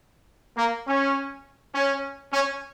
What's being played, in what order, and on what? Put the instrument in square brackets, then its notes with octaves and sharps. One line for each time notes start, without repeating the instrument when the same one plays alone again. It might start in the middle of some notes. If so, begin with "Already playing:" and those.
[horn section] A#3
C#4
C#4
C#4